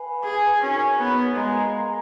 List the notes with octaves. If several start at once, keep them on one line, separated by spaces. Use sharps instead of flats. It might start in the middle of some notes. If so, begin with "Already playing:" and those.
Already playing: B4 F5 G#5 B5
G#4
C#4 D#4 F#4 A#4 C#5
B3
G#3 A#4 F5 A#5